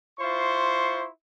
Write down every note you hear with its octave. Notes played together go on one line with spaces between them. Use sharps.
E4 F4 C5 C6 C#6